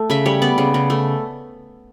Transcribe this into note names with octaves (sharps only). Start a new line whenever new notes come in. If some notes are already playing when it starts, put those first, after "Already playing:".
Already playing: A3
C#3 E5
G3 C#5
B3 D5
C#3
C#3
A3